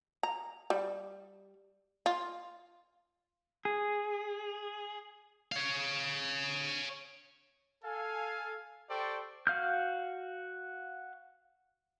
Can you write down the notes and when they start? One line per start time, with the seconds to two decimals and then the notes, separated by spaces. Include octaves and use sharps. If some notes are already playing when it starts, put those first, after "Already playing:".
0.23 A#5
0.70 G3
2.06 F4
3.65 G#4
5.52 C#5 F5
7.84 A4 F5 G#5
8.90 G4 A4 C5 D5 G5 C#6
9.47 F#4 F5 F6 G6